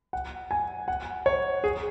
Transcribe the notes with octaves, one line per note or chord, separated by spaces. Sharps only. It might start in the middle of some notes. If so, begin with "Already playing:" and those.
F#5
G#5
F#5
C#5
G#4